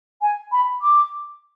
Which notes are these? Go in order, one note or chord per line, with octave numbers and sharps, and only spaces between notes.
G#5
B5
D6